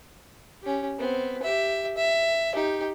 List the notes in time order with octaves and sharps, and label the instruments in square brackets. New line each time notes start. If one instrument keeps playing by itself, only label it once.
[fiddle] C#4 G4
B3 C4
G4 E5
E5
D#4 G4